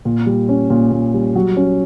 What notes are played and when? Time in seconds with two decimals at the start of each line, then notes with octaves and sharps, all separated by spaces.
0.05 A#2
0.26 G3
0.49 C#4
0.70 A#2
0.91 A#2
1.14 G3
1.35 F#3
1.56 C#4